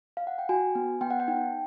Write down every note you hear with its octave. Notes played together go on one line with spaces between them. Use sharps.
F5
F#5
G5
F#4 G#5
B3
B3 G5
F#5
G5
D#4